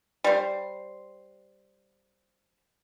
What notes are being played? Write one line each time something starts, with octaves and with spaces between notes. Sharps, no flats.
G3 C5